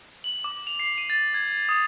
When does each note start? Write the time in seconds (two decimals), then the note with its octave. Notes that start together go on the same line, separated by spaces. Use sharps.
0.24 F#7
0.44 D6
0.67 F7
0.80 C7
0.98 D#7
1.10 A6
1.34 G#6
1.69 D#6